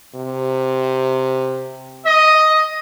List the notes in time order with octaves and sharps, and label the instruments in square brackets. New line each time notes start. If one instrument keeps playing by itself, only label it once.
[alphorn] C3
[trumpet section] D#5